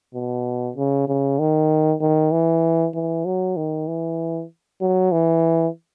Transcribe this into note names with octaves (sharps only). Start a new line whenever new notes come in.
B2
C#3
C#3
D#3
D#3
E3
E3
F#3
D#3
E3
F#3
E3